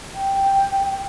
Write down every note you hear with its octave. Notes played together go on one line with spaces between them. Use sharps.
G5